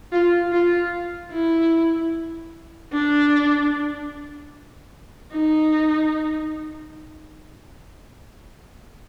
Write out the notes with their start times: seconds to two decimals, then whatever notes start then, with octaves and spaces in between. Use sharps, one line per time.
0.12 F4
0.52 F4
1.32 E4
2.92 D4
5.32 D#4